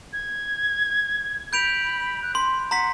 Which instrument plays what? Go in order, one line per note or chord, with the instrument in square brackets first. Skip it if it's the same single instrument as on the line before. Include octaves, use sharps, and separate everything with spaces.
[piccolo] G#6
[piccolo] B5 [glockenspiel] G6 D7 F7
[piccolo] F#6
[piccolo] B5 [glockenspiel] C6
[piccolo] F#5 [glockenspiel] A#5 C6 B6